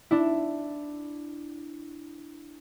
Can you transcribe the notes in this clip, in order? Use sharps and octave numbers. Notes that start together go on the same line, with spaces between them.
D4 E4